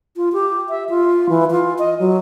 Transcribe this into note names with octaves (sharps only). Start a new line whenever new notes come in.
F4
G4
E5
F4
E3
F4
D#5
F#3